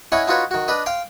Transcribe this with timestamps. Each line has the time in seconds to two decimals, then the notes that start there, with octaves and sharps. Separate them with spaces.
0.12 C#4 E4 C#5 D#5 F#5
0.28 D#4 F4 F#4 B4 C#5
0.51 D#3 F#4
0.68 D4 B4 D#5
0.86 F5 G5 C6